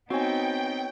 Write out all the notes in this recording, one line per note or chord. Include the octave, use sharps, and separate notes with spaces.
B3 C4 D#4 F#4 C#5 G5 G#5